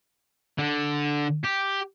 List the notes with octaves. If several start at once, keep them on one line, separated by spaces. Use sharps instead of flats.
D3
G4